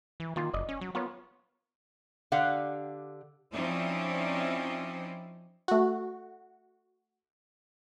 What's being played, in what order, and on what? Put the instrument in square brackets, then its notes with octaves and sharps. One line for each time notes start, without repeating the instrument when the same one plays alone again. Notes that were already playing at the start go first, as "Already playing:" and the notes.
[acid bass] E3
[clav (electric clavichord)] A#2 F4 [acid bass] D#3
[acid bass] F#1 [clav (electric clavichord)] D5 D#5
[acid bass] C#4
F#3
[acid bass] B3 [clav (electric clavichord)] F4 A#4 C#5
[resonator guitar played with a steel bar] D3 G4 F5 F#5
[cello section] F3 C4 C#4 D#4 E4 D5
[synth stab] A3 F#4